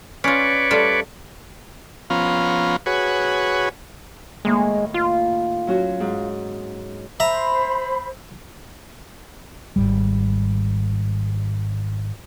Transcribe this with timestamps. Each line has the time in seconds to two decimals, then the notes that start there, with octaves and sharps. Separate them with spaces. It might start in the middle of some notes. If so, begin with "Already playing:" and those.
0.24 C#4 F4 B4 C#5 D5
0.71 G3 A3 F4
2.10 F3 B3 C#4 F4 A#5
2.86 F#4 G#4 B4 C#5
4.45 A2 D#3 G#3 A#3
4.94 F4
5.67 F#3 C#4 F#4
6.00 G#2
7.20 C5 E5 A#5 B5
9.76 G#1 C#2 G3